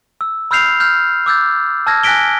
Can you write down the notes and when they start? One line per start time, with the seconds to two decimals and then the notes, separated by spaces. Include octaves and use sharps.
0.21 E6
0.51 B5 E6 F6 G6 C7 F7
0.80 F6 G6
1.26 D6 E6 G6 A6
1.87 A5 E6 F6 G#6 A#6
2.03 G#5 F#6 A#6 B6 D7 G7